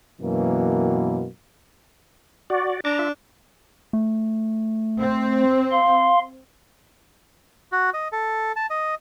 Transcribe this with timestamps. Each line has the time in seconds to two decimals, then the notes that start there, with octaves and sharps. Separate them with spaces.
0.21 F#2 B2 E3 A#3
2.50 F#4 D5
2.85 D4 A#5 D6
2.99 F4 E5
3.93 A3
5.01 C4
5.71 F5 C6
7.72 F#4
7.94 D#5
8.12 A4
8.56 A5
8.70 D#5